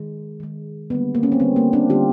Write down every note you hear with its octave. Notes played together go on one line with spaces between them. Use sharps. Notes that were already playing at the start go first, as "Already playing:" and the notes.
Already playing: D#3 G#3
D#3 G#3
D3 G3 A#3 B3
A#3
C#4
C4
D3 G3 A#3 B3
A#3
C4 D4
D3 G3 A#3 F4 G4